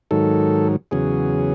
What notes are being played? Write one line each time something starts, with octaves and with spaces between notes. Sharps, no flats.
G#2 D#3 F#3 A4
E2 C#3 F#3 G#4